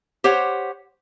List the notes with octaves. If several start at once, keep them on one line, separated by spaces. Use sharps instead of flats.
G4 C5 C#5 F#5